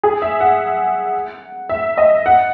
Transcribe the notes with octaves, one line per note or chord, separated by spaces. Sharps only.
G#4
E5
F#5
E5
D#5
F#5